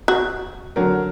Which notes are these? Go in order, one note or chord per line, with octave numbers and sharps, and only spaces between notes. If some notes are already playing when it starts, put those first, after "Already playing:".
F#4
D3 F#3 A#4